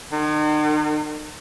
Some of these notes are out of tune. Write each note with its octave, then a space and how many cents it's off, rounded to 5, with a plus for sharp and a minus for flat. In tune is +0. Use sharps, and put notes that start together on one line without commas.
D#3 -45